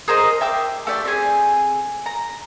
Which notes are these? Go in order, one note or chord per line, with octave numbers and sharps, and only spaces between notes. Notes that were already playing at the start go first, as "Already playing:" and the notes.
G#4 A#4 C5 D#5
E5 G5 D6 E6
A3 G4 D5
C4 G#4
A#5